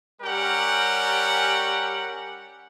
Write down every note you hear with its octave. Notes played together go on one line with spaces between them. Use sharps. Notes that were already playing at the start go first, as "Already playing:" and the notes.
G3 C#4 G4 A#4 F#5